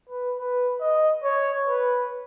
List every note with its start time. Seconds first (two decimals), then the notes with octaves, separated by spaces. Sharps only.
0.10 B4
0.38 B4
0.81 D#5
1.23 C#5
1.66 B4